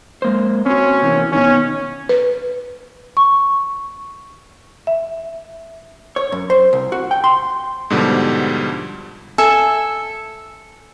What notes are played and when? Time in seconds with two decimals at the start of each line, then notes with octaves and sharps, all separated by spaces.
0.22 G#3 A#3 C5
0.66 C4 C#4 F#4
1.02 C3 E3 A#3
1.32 B2 D#3 C#4
2.09 B4
3.17 C#6
4.87 E5
6.16 C#5
6.32 F#2
6.50 C5
6.73 C2
6.92 F#4
7.11 G5
7.24 C6
7.90 G#2 B2 D3 F3 G3
9.38 A4 E5 G#5